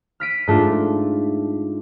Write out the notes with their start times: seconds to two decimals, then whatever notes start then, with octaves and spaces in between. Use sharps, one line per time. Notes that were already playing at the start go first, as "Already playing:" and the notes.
0.20 F6 B6 D7 D#7
0.47 G#2 A3 D4 F4